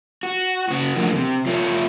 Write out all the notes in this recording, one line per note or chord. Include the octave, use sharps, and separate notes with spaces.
F#4
C#3 F#4
E2 A2 D3 F3 A#3
C3
F2 F4 C#5 E5